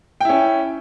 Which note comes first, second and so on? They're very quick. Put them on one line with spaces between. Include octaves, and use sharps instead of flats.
G5 E4 C#4